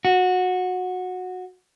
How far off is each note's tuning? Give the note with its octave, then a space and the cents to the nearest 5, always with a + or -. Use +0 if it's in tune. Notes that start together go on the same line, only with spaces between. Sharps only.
F#4 -15